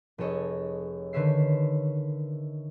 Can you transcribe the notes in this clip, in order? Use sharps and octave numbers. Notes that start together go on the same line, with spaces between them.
F1 G#4 A4 C#5 D#5
D3 D#3 B4 C#5 E5 C7